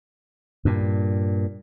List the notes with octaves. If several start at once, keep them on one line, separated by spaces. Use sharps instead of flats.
G2 A#2